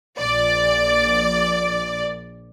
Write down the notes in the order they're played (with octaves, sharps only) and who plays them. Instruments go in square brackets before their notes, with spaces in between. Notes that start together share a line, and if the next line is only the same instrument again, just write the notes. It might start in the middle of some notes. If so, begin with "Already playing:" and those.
[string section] A#1 D5